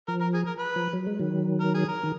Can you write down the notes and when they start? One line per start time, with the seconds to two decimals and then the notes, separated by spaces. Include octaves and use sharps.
0.08 F3 A#4
0.21 A#4
0.34 G#4
0.47 A#4
0.59 B4
0.76 F3
0.93 F#3
1.06 G#3
1.19 D#3 F#3
1.61 A#4
1.75 G#4
1.88 A#4
2.04 D#3